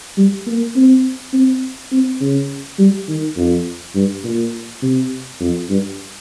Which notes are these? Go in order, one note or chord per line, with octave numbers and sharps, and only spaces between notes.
G3
A#3
C4
C4
C4
C#3
G3
D#3
F2
G2
A#2
C3
F2
G2